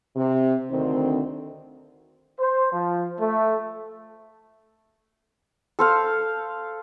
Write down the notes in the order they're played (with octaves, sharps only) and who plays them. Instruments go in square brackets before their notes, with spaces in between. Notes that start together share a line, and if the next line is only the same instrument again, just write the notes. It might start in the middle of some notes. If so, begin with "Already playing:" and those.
[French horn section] C3
D2 D3 D#3 C4
[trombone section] C5
F3
A3
[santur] A4 C5 F5